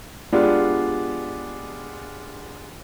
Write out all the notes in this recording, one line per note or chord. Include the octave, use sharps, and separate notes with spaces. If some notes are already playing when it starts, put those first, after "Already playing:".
G#3 B3 D4 F4 G4